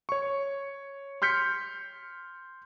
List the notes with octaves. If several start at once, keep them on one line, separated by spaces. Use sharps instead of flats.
C#5 C#6
C6 F6 G6 B6 C#7